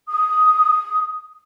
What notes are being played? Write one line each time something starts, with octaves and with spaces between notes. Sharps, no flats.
D#6